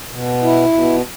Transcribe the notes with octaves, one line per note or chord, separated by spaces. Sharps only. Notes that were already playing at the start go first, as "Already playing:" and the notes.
B2
E4
B2